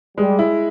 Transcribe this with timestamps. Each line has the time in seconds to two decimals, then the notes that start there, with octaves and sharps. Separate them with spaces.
0.18 G3 G#3
0.39 E4